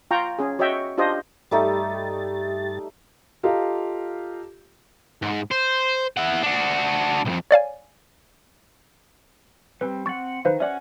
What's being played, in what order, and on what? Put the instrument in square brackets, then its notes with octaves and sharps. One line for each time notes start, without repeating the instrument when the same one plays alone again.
[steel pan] F4 G5 A#5 C#6
C#4 G#4
F#4 C#5 D#5 E5 G5
D4 F4 G4 C5 D#5
[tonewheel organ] G2 G4 A6 [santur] G3 A3 D#4
[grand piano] F4 G4 A4 D#5 F5 A#5
[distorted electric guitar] G#2
C5
E4 F#5
D4 F#4
B1 F2
[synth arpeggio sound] C#5 D5 F5 G#5
[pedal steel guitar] G3 C4 [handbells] B4
[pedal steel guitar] C4 F#5 [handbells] C#6 A6
[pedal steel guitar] D#3 [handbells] B4 C5 F5
[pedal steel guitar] C#4 F#4 F#5 [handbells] D5 E5